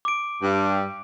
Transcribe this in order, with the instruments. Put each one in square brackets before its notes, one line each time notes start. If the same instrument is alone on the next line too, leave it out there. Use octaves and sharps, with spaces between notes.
[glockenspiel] D6 D7
[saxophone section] G2